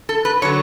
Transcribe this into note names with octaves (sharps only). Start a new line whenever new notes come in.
A4
B4
D3 F#3 C#5